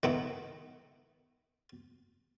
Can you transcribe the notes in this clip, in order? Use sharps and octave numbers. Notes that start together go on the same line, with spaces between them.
D#3 B3 E4